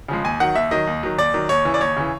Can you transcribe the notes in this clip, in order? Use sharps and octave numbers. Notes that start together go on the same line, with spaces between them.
C#3 F3 G#3
D#2 G#5
D#3 F#3 F#5
D#2 E5
D#3 F#3 D#5
D#2
D#3 F#3
D#2 D5
D#3 F#3
D#2 C#5
C#3 E3
D5
D#2 C#5
C#3 E3